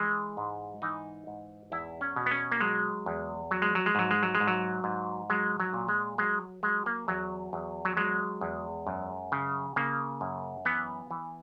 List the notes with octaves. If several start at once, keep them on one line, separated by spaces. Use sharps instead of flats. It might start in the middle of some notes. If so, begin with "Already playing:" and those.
Already playing: E3 G#3
G#2
E3 D#4
G#2
E2 E4
C#4
B2
B3
C#4
A#3
F#3 G#3
E2
F#3
G#3
F#3
G#3
G#2 F#3
G#3
F#3
G#3
G#2
F#3
G#2
F#3 G#3
F#3
A#2
G#3
F#3 G#3
F#3 G#3
A#3
E2 F#3
E2
F#3
F#3 G#3
E2
F#2
C#3
C#3 A#3
F#2
E3 B3
E3